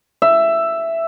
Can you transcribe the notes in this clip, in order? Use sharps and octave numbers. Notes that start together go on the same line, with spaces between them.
E5